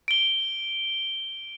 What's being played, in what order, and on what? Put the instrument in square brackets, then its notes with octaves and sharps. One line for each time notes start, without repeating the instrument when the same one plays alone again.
[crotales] D7 G7